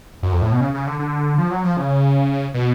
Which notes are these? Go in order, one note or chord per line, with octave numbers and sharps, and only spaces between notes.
F#2
F2
A2
B2
C#3
C#3
D3
D3
F3
F#3
F3
C#3
B2